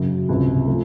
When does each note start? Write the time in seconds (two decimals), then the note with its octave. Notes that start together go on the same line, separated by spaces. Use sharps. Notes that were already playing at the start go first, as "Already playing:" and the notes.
Already playing: F#2 C#3 F#3
0.29 C#2 C3 F3
0.67 F3 A3